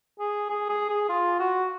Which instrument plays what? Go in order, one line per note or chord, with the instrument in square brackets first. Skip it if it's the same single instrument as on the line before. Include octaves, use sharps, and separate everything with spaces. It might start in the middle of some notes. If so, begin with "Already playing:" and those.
[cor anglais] G#4
G#4
G#4
G#4
F4
F#4